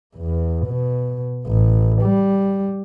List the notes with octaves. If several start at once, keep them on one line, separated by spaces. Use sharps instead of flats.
E2
B2
A1
G3